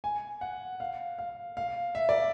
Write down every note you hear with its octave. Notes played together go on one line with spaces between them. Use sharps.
G#5
F#5
F5
F5
F5
E5
D5